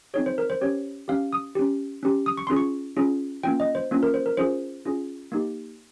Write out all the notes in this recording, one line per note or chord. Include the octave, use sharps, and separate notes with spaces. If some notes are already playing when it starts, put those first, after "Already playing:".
C4 D#4 G#4 C#5
C5
A#4
C5
C#4 G4 C#5
C#4 G4 F5
D#6
C#4 G4
C#4 G4
D#6
C#6
C#4 F4 G#4 C6
C#6
C#4 F4 G#4
A#3 C#4 F4 G5
D#5
C5
A#3 C#4 F4
A#4
C5
A#4
C#4 F4 G#4 C5
C#4 F4 G#4
A#3 D#4 G4